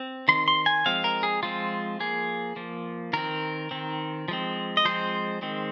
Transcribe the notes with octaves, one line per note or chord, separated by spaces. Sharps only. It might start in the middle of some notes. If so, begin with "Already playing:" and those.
Already playing: C4
D#3 C4 C6
C6
G#5
F3 G#3 C4 F5
A#4
G#4
F3 G#3 C4 F4
F3 A#3 G#4
F3 A#3
D#3 C4 A#4
D#3 C4
F3 G#3 C4
D#5
F3 G#3 C4 C5
D#3 G#3 C4